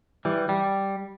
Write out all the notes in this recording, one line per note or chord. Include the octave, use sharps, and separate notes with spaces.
E3 G3
G3